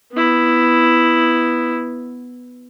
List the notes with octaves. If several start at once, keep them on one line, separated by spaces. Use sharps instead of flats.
B3 E4